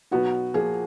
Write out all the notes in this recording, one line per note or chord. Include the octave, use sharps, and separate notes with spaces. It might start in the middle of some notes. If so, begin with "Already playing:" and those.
B2 F#3 B3 D#4 F#4
A#2 F3 A#3 G#4